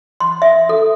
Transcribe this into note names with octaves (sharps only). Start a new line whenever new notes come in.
C6
E5
A4